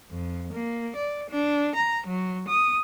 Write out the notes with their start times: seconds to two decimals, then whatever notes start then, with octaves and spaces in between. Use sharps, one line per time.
0.11 F2
0.53 A#3
0.96 D5
1.30 D4
1.75 A#5
2.06 F#3
2.48 D#6